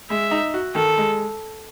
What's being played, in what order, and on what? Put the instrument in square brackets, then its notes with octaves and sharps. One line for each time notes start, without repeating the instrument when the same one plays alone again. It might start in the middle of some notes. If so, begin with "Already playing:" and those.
[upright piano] G#3 [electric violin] E5
[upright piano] D#4
F#4
[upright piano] D#3 [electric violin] A4
[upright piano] G#3